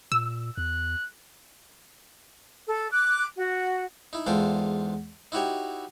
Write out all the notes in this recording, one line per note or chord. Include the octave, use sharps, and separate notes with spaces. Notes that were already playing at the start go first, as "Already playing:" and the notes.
A#2 E6
E2 F#6
A4
D6 F#6
F#4
D#4 E4
E2 G#2 G#3 F4 A4 G5
D#4 E4 F#4 G4 C#5